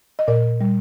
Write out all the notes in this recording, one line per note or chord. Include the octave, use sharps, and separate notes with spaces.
D#5
A#2 A#4 D5
G3